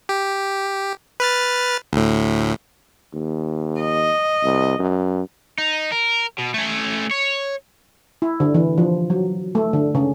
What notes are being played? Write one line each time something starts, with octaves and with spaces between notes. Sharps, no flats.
G4
B4 F6 A6
D2 A2
D#2
D#5
C2
F#2
D#4
A#4
B2
A3 C#4
C#5
E4
D3
E3
F3
F#3
A3
D3
C#3